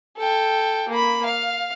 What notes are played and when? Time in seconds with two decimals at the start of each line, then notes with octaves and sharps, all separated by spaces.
0.18 A4 G5
0.89 A#3 B5
1.25 F5